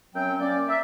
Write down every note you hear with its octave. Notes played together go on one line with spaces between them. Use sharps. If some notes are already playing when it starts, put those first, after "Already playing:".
F#2 F#3 C4 C#4 G5
A#3 C#4 D5
A#4 E5